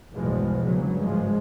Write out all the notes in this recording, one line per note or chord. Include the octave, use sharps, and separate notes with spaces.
B1 E2 G2 B2 F3 G#3
G1 G2 C#3 F#3
G#1 F3 G#3